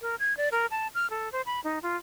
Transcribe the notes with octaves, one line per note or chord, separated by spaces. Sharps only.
A#4
G#6
D5
A#4
A5
F6
A4
C5
B5
D#4
F4